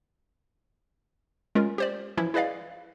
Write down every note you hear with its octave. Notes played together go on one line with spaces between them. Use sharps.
G#3 C#4 F4 A#4
G4 C5 D5
E3 F3 C#4 E4
E4 G#4 B4 D5 D#5 F5